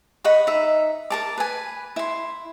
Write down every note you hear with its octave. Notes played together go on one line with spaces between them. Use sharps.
D#5 F#5 B5 C#6
D#4 E5
A#4 A5 D6
B4 G#5
E4 C6